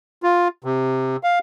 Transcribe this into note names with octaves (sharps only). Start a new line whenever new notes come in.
F4
C3
F5